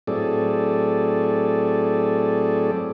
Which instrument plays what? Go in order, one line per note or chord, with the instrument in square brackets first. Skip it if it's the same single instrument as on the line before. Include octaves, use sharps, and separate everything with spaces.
[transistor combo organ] A2 F#3 C4 G#4 A4 D5